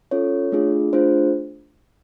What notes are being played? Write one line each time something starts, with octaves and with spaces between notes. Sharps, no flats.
C#4 F4 A4 C#5
A3 D4 F4 G#4
A3 D4 F4 G#4 C5